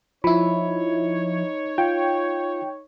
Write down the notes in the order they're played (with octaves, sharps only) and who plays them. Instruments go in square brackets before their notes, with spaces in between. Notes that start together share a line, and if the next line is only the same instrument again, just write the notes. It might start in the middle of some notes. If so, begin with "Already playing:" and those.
[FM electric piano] F3 E4 [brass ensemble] D#4 C#5 [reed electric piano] B5
[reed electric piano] F4 [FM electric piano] G5